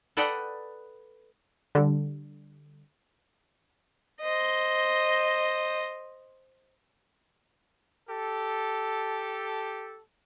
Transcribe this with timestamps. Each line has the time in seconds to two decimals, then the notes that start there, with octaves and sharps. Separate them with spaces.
0.17 A4 B4 D5 D#5 F#5 G5
1.75 D3 G3
4.21 C5 D#5
8.08 G4 A4